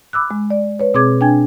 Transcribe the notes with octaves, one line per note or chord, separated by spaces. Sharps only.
B5 D6 E6 F#6
G#3
D5
B4 C#5
B2 C4 G#4 D6 G#6
D4 G5 G#5 G#6